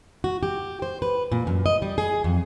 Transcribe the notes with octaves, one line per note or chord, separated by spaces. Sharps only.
F#4
G4
C5
B4
A#2
F#2
D#5
G3
G#4
F2